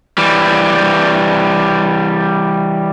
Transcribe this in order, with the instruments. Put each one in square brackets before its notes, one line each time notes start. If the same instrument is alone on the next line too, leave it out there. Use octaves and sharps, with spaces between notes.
[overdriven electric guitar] E3 G3